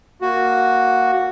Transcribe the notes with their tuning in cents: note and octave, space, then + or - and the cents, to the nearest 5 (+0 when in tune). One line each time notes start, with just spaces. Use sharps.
A#3 +0 F#4 +0